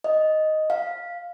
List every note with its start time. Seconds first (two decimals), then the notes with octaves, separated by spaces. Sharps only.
0.04 D#5
0.70 F5